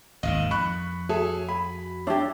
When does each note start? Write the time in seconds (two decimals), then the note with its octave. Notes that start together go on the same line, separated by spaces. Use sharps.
0.23 G#1 D#2 D#3 D#5 F5
0.51 F2 B5 C#6 F#6
1.09 F#4 G#4 A4 C#5 E5
1.49 G#5 B5
2.07 D4 E4 G4 C#5 E5 A5